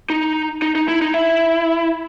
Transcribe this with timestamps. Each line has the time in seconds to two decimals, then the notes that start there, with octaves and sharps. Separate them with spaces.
0.10 D#4
0.62 D#4
0.75 D#4
0.88 E4
1.02 D#4
1.14 E4